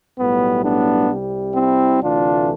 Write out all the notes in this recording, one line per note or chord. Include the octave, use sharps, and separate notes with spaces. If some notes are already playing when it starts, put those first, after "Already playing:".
B1 A2 G3 B3
B3 D4
C2 C3 G3
C4 E4
D2 C3 E3 A3 D4 F4